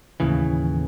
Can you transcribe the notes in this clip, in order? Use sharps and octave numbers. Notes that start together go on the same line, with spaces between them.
D#2 A2 C#3 E3